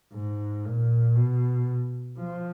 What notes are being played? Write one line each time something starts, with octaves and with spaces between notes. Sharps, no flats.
G#2
A#2
B2
F3